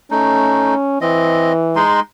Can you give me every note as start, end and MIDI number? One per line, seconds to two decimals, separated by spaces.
0.11 0.75 57
0.11 0.98 61
0.11 0.75 63
1.01 1.82 52
1.01 1.53 60
1.01 1.53 75
1.76 2.00 56
1.76 2.00 63
1.76 2.00 84